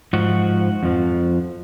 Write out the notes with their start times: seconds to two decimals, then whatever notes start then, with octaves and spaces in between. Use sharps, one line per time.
0.13 G#2 F3 F#4
0.83 F2 F3